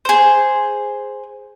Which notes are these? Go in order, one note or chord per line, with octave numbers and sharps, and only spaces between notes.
G#4 C5